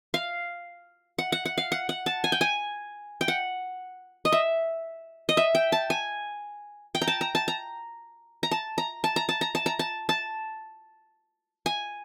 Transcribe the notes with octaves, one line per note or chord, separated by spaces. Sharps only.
F5
F#5
F#5
F#5
F5
F#5
F#5
A5
G#5
G5
G#5
G5
F#5
D#5
E5
D#5
E5
G5
A5
G#5
G5
A#5
A5
A#5
A5
A#5
A#5
A5
A#5
A5
A#5
A5
A#5
A5
A#5
A5
A5
G#5